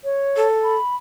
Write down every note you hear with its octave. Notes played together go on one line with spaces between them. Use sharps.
C#5
A4
B5